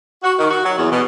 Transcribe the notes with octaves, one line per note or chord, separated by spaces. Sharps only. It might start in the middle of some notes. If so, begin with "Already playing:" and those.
F#4
D#3
F#4
F#3
E2
B2